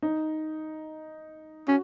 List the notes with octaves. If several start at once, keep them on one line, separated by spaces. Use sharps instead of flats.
D#4
C#4 F#4